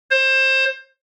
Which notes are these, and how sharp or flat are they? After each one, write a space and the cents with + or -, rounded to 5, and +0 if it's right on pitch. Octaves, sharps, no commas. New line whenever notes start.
C5 +25